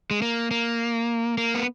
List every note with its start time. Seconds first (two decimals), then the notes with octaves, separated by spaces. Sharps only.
0.11 G#3
0.22 A#3
0.51 A#3
1.38 A#3
1.55 B3